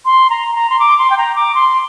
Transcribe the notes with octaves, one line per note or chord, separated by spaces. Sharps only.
C6
A#5
A#5
C6
D6
C6
G5
A#5
D6
C6